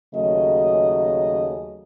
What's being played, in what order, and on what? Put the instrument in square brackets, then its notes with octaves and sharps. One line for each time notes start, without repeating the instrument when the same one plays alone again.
[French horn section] D#2 C#3 F#3 A3 D#5